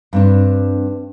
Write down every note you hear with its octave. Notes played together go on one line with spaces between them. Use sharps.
G2 C4 D4